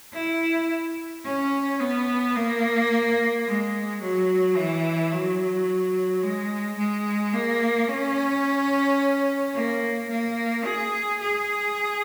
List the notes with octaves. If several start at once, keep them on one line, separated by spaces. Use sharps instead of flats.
E4
C#4
B3
A#3
G#3
F#3
E3
F#3
G#3
G#3
A#3
C#4
A#3
A#3
G#4
G#4